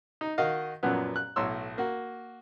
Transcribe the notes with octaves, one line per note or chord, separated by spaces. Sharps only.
D#4
D#3 F#4 D#5 F5
F#2 A#2 F3 F#3 B3
F#6
B1 A2 C#5 C6 E6
A#3 F#4